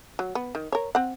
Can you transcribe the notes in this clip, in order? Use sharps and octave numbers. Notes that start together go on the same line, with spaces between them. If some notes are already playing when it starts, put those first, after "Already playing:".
F#3
B3
D#3
A#4 C#5
C4 F#5